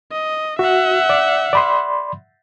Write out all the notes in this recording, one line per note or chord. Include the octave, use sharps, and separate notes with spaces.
D#5
F#4 E5 F#5
D5
D5 B5 C6